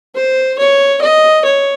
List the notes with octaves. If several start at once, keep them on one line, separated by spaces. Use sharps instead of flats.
C5
C#5
D#5
C#5